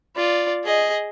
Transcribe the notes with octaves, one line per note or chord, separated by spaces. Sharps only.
F4 D5
G#4 D#5